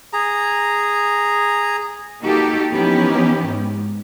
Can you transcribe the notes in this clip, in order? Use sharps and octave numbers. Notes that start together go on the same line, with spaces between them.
G#4 A#5
A#3 D#4 F#4 G4 A4
E3 F3 B3 C#4 D#4 G4
G#2